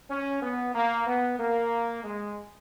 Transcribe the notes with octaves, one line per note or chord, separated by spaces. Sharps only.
C#4
B3
A#3
B3
A#3
G#3